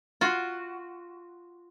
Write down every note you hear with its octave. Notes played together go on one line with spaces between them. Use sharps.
F4 F#4